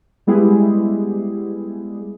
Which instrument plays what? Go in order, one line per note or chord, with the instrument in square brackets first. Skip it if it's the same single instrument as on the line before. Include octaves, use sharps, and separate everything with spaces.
[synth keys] G3 G#3 B3 E4 G4 G#4